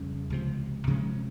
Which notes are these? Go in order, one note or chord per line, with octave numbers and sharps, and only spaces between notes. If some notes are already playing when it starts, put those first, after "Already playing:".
Already playing: F2 C#3 G3 C#4
C#2 C3 F3
C3 F3 G#3 C#4